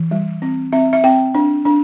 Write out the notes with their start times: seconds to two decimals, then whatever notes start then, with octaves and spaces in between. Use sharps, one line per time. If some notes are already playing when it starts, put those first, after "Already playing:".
Already playing: E3
0.11 G3
0.42 C4
0.72 C4 E5
0.93 E5
1.04 C4 G5
1.35 D4
1.65 D4